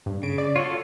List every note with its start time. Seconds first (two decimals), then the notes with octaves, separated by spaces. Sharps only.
0.06 G2
0.23 C#3 D7
0.38 D5
0.56 F4 F#4 A4 C#5